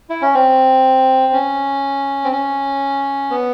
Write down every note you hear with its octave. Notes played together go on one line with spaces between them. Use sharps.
E4
C#4
C4
C#4
C4
C#4
B3